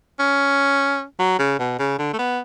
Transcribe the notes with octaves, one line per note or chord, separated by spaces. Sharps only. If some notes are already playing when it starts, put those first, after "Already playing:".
C#4
F#3
C#3
B2
C#3
D3
A3
B3